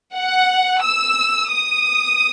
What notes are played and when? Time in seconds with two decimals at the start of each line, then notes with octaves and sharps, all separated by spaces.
0.14 F#5
0.83 E6
1.51 D#6